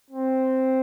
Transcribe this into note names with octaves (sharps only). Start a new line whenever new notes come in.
C4